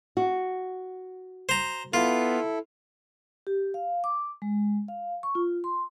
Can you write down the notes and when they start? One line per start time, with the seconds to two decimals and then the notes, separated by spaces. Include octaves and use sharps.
0.17 F#4
1.49 C5 A#5
1.94 B3 E4 F4 A4
3.47 G4
3.74 F5
4.04 D6
4.42 G#3
4.88 F5
5.23 C#6
5.35 F4
5.64 C6